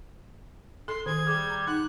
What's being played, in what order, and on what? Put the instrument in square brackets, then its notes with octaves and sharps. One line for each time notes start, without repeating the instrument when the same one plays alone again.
[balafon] A4 [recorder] C6
[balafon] D#3 [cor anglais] G#4 [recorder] G#6
[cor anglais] G3 [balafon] G#4
[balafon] A#5
[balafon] D#4 [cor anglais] F#5 [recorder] F#6